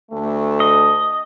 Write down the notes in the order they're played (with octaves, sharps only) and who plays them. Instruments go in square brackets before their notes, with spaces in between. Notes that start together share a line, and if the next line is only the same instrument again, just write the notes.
[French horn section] D2 A3
[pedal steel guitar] D#5